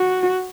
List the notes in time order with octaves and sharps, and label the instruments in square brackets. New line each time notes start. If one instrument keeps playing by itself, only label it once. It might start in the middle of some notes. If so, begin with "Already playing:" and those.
Already playing: [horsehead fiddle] F#4